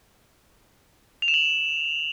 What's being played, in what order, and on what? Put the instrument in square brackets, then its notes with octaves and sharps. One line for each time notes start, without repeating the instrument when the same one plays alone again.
[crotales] F7
E7
F#7